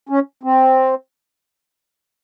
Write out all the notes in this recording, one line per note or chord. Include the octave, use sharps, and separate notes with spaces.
C#4
C4